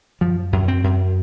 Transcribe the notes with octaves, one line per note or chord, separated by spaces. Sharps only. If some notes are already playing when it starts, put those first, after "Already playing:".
F#2 F3
F#2
C4
F#2